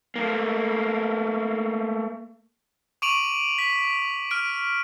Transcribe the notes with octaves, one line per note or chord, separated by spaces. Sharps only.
A3 A#3
C#6 D6 D7 D#7 F7 F#7
B6
F6 D7